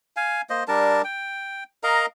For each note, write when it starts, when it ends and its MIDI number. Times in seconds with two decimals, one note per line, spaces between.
0.16 0.42 77
0.16 0.42 80
0.50 0.64 58
0.50 0.64 72
0.50 0.64 75
0.68 1.02 55
0.68 1.02 62
0.68 1.02 70
0.68 1.02 81
1.04 1.64 79
1.83 2.06 70
1.83 2.06 75
1.83 2.06 77
1.83 2.06 82